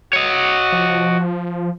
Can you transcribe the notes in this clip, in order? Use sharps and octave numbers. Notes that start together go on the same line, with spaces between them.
F#4 C#5 D#5
F3